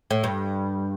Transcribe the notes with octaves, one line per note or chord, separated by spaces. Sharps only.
A2
G2